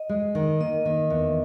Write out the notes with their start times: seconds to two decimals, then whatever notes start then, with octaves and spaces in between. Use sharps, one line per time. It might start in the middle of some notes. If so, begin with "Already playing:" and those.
Already playing: D#5
0.09 G#3
0.35 D#3
0.60 A#3 D#5
0.85 D#3
1.10 E2